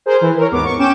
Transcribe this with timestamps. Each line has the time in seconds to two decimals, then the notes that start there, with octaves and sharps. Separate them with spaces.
0.06 G#4 A#4 C5
0.21 E3
0.37 A#4 C#5
0.51 D#2 G#2 B3 D6
0.64 C#6
0.79 C#4 G5 D6 E7